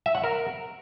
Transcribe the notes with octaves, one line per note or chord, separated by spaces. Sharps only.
E5
F#5
A#4